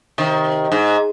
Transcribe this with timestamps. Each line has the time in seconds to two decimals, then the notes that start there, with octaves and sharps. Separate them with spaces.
0.18 C3 D#3
0.72 G#2